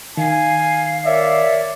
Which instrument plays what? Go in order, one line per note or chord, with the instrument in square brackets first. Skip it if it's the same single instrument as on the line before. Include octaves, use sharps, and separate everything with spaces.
[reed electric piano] D#3 [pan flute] F5 [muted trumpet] G#5
[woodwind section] A#4 C#5 E5 [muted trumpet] D5